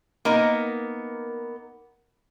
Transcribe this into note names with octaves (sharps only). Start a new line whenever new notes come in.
A#3 B3 D#4 A#4